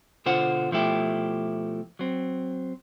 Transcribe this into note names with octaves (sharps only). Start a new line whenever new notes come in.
B2 D3 F4 C5 F#5
B2 F3 A3 E4 G4
F#3 C4